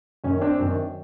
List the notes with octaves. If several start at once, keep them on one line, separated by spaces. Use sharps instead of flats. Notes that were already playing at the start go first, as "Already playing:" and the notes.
F#2 D#3 C#4
C4 D4
F#2 D#3